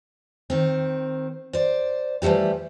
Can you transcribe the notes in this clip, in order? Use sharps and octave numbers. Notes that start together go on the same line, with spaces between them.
D#3 C4
C5 D5
E3 F3 G3 A3 G4